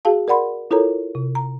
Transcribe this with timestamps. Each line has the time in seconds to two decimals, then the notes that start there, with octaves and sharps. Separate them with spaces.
0.05 F#4 G#4 F5 A5
0.28 A#4 D5 F#5 B5 C6
0.71 E4 F4 A4 A#4 C#5 A#5
1.15 C3
1.35 A#5